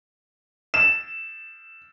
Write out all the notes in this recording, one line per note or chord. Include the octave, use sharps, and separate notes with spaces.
E7